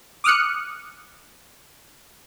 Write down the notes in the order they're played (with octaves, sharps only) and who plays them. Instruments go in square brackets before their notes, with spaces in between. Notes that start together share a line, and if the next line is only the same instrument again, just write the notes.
[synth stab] D6 D#6 F6 F#6 C#7